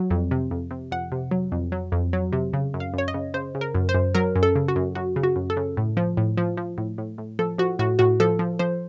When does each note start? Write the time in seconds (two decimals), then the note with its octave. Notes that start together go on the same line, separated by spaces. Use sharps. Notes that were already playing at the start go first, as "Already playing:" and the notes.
Already playing: F#3
0.11 F2
0.31 C3
0.51 F2
0.71 C3
0.92 F2 F#5
1.12 C3
1.31 F#3
1.52 F2
1.72 F#3
1.92 F2
2.13 F#3
2.33 C3
2.53 C#3
2.74 F#2
2.80 F5
2.94 F#2 C#5
3.08 D#5
3.14 C#3
3.34 C#3 C5
3.55 C#3
3.61 A#4
3.75 F#2
3.89 C5
3.94 F#2
4.15 F#3 A#4
4.36 F#2
4.43 A4
4.56 C#3
4.68 F#4
4.76 F#2
4.95 F#2 F#4
5.16 C#3
5.23 F#4
5.36 F#2
5.50 A4
5.57 C#3
5.77 A2
5.97 F3
6.17 A2
6.37 F3
6.57 F3
6.78 A2
6.98 A2
7.18 A2
7.39 F3 A4
7.58 F3 F#4
7.79 A2 F#4
7.99 A2 F#4
8.20 F3 A4
8.39 F3
8.59 F3 C5